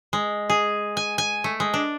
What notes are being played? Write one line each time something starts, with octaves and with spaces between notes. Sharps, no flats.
G#3
G#4
G#5
G#5
A3
G#3
D4